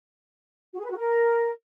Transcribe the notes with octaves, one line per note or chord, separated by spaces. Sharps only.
F#4
G#4
B4
F#4
A#4